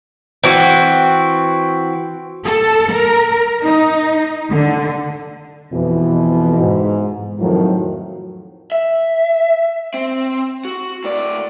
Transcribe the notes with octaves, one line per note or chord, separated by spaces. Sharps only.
E3 C4 F#4
A4
A#4
D#4
D3
F2 B2 E3
G#2
F2 A2 D#3 F3 F#3
E5
C4
F#4
A2 D5